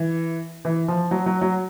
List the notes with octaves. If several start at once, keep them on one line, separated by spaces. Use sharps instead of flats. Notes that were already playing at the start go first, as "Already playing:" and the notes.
Already playing: E3
E3
F3
F#3
F#3
F#3